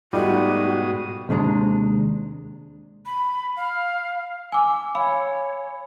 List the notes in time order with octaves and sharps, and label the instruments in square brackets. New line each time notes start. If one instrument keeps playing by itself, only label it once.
[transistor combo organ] G#2 B2 D#6 [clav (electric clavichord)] G3 [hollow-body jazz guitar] A3 D#4 F4 [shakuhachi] F#4
[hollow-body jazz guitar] D#2 C3 G#3 D4 A#5
[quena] B5
F5
[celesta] G#5 D6 [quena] E6
[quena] C#5 [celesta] F5 G#5 B5